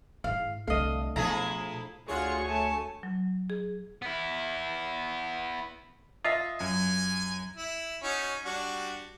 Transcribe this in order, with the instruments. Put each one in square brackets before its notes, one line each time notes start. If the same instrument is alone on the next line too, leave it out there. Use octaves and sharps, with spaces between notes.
[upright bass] G#2 E4 [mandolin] F5
[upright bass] C2 D3 [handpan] A3 D4 A4 [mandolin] D#5 F5
[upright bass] B2 [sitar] F3 E4 G#4 [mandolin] A#5
[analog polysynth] D2 C#5 C#6 [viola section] F4 F#4 [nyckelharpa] G#4
[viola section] A3 [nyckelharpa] G#5 A5
[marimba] F#3
G#4
[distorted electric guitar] B3 E4
[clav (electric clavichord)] F4 [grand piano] D#5 E5
[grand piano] F#2 [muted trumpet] G#5
[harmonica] E4
C#4 D#4 F#4
G3 D4 F#4